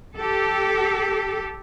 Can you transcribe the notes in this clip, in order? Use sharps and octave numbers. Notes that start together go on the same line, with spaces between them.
G4 A4